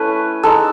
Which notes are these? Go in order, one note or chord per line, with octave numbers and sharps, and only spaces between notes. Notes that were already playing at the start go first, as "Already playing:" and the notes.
Already playing: A3 C#4 E4 B4 C#5
G#3 D#4 A4